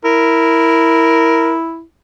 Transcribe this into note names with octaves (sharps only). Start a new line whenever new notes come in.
E4 A#4